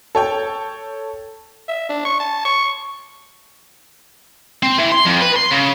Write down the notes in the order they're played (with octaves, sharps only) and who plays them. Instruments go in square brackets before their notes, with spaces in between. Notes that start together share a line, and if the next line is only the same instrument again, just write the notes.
[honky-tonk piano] A4 C#5 G5
[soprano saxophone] E5
D4
C#6
A5
C#6
[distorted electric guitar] C4
E3
C6
F2
B4
C6
C#3